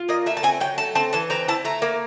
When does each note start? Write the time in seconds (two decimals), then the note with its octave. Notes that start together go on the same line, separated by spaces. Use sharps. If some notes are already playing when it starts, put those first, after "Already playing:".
Already playing: F4
0.09 A#3 D#5
0.26 A3 E5
0.37 A5
0.43 C4 G#5
0.60 F#3 G5
0.78 A3 A5
0.95 C4 A5
1.13 E3 A5
1.30 C4 A#5
1.48 E4 A5
1.65 A3 A#5
1.82 A#3